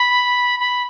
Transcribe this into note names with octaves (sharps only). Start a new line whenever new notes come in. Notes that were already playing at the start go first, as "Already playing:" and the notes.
Already playing: B5
B5